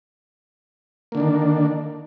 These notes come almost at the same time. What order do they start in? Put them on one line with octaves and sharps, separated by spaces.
A#3 D3 D4 D#3